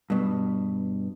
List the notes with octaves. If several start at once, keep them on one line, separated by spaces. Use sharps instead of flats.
G2 B2